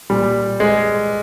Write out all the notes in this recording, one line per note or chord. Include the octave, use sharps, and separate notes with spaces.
A#2 G3
G#3